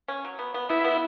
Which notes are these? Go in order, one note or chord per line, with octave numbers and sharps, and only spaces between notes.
C#4
F#3
B3
B3
B3 E4
B3